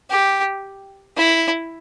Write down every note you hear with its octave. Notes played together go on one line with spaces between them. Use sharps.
G4
E4